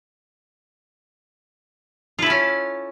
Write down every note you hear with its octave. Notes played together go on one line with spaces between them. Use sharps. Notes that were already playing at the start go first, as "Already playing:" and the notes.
C#4 E4 F4 A4